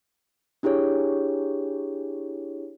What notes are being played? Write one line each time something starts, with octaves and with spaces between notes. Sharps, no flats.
D4 E4 G4 G#4 C#5